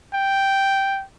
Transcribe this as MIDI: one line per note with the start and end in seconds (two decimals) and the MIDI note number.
0.14 1.04 79